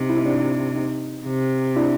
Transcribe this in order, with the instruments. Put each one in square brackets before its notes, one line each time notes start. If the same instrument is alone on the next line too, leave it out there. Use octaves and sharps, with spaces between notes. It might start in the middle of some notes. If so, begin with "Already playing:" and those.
Already playing: [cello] C3 [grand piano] D#4
[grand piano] E4
D#4
D4
D#4
[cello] C3
[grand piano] D4 E4